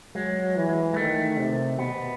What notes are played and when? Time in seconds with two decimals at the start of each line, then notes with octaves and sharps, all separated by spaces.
0.15 F#3 G#3
0.56 E3
0.93 G#3
0.97 D#3 A3
1.38 C3
1.78 B2 B3